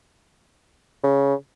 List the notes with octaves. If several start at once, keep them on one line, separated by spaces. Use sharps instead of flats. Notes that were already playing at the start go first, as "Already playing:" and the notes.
C#3